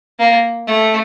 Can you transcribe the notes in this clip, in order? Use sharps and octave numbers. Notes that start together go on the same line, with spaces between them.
A#3
A3